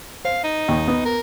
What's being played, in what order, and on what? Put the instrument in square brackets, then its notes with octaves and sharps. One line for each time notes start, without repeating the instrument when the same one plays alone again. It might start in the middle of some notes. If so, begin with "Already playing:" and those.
[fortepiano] C5 [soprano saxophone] F5
[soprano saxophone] D#4
[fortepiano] D#2
B3 D#6
[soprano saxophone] A#4